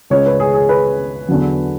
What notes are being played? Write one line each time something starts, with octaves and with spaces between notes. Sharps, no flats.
C#2 C#3 G#3 C#5
B4
G#4
G#4
B4
E2 D3 F#3